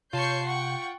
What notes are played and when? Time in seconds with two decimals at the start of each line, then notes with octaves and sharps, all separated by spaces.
0.13 C3 F4 C#5 A5 C#6 G6 C7
0.46 F#5 G5 C#6